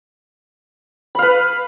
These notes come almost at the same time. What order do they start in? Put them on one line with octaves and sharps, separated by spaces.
B5 F5 B4